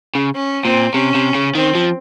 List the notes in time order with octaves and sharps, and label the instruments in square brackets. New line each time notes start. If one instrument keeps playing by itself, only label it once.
[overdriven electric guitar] C#3
[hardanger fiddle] C#4
[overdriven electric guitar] A#2 [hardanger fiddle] C4
[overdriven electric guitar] C3 [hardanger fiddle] C#4
[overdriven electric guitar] C3
C#3
[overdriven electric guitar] D#3 [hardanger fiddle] C4
[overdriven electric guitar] F3